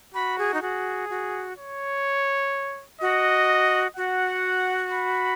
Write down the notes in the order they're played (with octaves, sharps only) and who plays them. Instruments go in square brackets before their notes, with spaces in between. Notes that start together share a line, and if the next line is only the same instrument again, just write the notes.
[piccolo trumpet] F#4 [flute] B5
[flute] G#4
D#4
[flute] F#4 [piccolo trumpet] G#4
[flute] F#4
[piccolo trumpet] C#5
[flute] F#4 [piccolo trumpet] D#5
[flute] F#4 [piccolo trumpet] F#5
[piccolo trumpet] B5